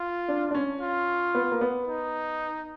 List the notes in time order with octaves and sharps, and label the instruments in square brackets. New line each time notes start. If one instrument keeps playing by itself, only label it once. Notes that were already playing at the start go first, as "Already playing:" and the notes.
Already playing: [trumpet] F4
[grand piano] D4
D4
C#4
[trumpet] F4
[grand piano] B3
A#3
B3
[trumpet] D#4